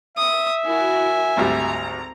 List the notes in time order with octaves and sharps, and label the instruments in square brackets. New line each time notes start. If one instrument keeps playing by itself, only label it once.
[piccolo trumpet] E5 [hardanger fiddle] D#6
[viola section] E4 F#4 A#4 [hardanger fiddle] G#5
[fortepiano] G#1 D2 G3 [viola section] A#5